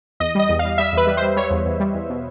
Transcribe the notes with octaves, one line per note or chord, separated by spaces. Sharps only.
E2 D#5
G3 D#5
E2
F5
G3
G3 E5
E2 B4
G3
G3 C5
G3 C#5
E2
E2
G3
E2
B2